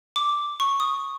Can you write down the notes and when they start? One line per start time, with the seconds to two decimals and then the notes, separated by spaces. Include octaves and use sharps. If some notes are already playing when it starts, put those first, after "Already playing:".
0.16 D6
0.60 C#6
0.80 D#6